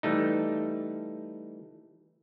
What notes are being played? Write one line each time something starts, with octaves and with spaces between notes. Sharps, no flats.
E3 G3 A3 D#4